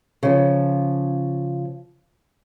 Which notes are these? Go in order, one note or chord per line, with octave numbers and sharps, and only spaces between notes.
C#3 F3